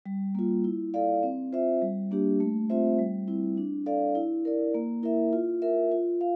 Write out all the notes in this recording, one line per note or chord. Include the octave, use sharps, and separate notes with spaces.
G3
A#3 F4
E4
A4 D5 F5
C4
F4 C5 E5
G3
A#3 D4 G4
A3
C4 F4 C5 E5
G3
C4 E4
D4
A4 D5 F5
E4
A#4 D5
A#3
E4 A#4 E5
F4
A#4 E5
F4
F5